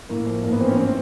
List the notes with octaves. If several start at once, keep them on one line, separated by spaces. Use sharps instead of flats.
A2 A#3
F3
G#2 A#3
B3
E3 C4
C#4
C4